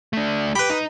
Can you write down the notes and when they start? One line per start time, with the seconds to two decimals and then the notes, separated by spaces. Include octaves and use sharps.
0.13 A3 D4
0.55 G4 B4 B5
0.70 D#4